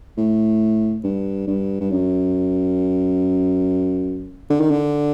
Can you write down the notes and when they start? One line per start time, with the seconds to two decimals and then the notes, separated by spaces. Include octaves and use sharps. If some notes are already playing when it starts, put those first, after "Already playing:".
0.18 A2
1.04 G2
1.47 G2
1.80 G2
1.90 F#2
4.50 D3
4.60 D#3
4.71 D3